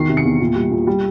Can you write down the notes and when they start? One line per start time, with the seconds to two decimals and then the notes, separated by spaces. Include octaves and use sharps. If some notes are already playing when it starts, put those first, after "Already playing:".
Already playing: E2 D#3 C7
0.09 C3
0.17 C#7
0.25 E2
0.40 A#2
0.56 G3
0.71 A#2
0.87 G3